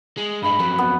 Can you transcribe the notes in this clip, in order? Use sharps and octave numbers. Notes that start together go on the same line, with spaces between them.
G#3
G2 G#3 B5
F2 F#3 B4
B3